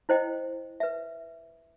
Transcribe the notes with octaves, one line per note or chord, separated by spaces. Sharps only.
E4 C5 D#5 G5
B4 E5